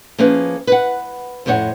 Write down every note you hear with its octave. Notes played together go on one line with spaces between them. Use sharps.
F3 A#3 C#4 G#4 B4
B4 F#5
F2 A2 C5 C#5 F#5